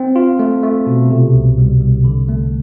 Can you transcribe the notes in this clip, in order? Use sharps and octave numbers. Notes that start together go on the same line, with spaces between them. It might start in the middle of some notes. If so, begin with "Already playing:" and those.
Already playing: C4
F4
A3
A3
B2
C3
C2
C2
C2
D3
A3